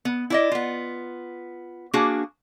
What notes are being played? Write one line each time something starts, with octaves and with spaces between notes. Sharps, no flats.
B3
E4 D5 D#5
B3 F4
A#3 D4 F#4 G#4